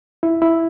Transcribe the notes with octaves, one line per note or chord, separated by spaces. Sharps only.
E4
E4